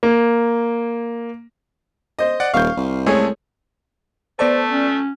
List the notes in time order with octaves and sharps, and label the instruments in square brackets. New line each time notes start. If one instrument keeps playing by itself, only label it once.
[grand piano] A#3
[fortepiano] C5 D#5
[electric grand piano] D5 F#5
[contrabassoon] D#1 [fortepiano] F5 [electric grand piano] C#6 G6
[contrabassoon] C2
[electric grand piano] G#3 A3 [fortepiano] G#4 A4 C#5
[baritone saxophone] A3 [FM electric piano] B3 D5 A5 [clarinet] C5
[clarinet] C#4